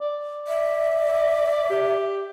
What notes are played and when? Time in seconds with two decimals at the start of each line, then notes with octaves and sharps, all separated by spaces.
0.01 D5
0.48 E5
1.70 G4